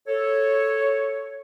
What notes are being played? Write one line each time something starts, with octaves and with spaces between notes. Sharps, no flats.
A4 C#5